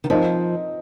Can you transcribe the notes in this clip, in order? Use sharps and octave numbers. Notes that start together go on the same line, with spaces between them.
D#3
F3 C4 D#4 A#4 D#5